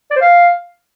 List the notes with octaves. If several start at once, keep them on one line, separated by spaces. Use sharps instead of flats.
D5
C5
F5